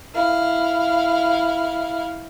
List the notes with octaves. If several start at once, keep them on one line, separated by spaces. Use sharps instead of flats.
E4 F5